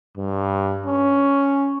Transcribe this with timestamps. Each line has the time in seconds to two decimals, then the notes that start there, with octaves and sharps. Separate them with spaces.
0.18 G2
0.86 C#4